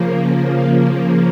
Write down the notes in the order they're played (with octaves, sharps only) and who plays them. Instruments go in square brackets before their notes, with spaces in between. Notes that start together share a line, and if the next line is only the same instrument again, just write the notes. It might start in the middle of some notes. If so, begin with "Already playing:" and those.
Already playing: [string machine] C#3 F3 A#3